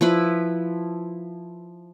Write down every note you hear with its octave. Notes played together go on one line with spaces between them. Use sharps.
F3 E4 B4